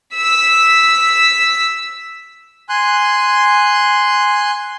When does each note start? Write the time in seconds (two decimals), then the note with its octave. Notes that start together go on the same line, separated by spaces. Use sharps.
0.15 E6 B6
2.69 G#5 C6 F#6